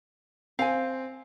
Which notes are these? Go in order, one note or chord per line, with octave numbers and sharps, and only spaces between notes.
C4 F5 G#5